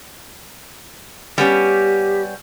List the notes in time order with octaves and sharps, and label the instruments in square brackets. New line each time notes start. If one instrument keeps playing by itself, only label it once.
[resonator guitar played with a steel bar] G3 B3 C#4 [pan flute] G4